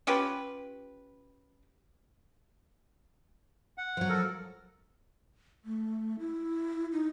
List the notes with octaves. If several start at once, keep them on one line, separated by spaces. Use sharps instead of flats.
C#4 F4 G4 B4
F#5
F3 F#3
A4 A#4
A3
E4
D#4